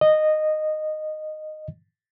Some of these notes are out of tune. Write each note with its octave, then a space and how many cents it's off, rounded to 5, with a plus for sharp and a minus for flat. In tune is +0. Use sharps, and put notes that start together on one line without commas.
D#5 -10